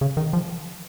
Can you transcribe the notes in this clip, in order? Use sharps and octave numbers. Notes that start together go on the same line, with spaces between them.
C#3
D#3
F3